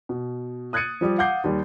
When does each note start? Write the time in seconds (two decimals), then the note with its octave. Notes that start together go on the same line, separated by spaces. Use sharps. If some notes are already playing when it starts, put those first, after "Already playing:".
0.09 B2
0.73 D#6 F#6 G#6 A6 C#7 D#7
1.01 F3 G3 G4
1.18 F5 F#5 D6 G6 C7
1.44 D#2 G3